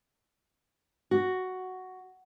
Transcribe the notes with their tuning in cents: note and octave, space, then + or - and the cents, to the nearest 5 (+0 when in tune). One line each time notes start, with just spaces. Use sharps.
F#4 +5